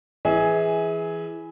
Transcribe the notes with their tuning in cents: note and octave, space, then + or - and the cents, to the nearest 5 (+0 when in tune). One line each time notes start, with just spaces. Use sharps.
E3 +10 G#4 +5 E5 -35